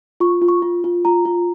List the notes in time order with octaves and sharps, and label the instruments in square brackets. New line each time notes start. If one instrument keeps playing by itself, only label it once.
[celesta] F4 C#6
F4
C#6
F4
F4
F4 A#5
F4